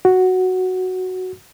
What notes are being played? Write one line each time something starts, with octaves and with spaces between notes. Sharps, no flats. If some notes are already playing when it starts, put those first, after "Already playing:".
F#4